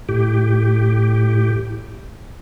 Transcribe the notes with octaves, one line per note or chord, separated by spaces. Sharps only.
A2 G4